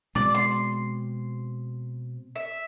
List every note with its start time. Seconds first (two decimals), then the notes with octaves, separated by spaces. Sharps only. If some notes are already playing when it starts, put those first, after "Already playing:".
0.15 B2 G#3 C4 D5
0.35 C6
2.36 E5